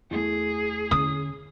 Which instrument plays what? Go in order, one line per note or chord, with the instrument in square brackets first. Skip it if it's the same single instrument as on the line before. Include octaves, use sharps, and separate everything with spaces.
[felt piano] E2 E3 A3 [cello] G#4
[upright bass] D3 C#4 [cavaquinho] D#6